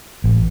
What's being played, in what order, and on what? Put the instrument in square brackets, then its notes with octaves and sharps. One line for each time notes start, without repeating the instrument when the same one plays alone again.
[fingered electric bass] A1